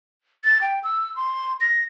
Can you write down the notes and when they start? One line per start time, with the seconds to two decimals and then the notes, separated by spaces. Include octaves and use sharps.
0.45 A6
0.61 G5
0.84 E6
1.16 C6
1.61 A#6